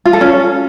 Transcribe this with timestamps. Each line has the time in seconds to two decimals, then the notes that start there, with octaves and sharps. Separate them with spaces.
0.05 F4
0.13 A4
0.21 C#4